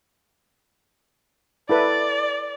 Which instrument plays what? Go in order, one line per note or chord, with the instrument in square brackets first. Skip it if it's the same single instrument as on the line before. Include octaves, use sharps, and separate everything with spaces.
[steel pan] E4 A4 B4 [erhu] D5